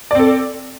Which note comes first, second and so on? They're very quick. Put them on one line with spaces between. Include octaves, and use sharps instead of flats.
D5 C4 A4